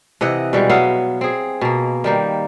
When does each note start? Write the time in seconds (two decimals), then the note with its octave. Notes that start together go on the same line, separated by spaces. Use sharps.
0.21 C3 E3 D#5 F#5
0.53 B2 G3 G#3
0.70 F#3 B3 E5 F5
1.21 C4 G#4
1.61 B2 A#3
2.04 D#3 G3 A#3